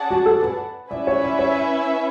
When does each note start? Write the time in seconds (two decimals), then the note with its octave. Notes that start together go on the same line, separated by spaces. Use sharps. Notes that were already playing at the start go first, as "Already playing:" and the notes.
Already playing: C#4 G#4 D5 F#5 A5
0.11 F#4
0.26 A4
0.43 B4
0.91 C#4 E4 B4 D5 E5
1.07 C#5
1.24 D5
1.39 C#5